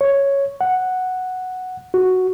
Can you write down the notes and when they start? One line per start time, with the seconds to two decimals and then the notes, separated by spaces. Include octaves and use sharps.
0.01 C#5
0.61 F#5
1.94 F#4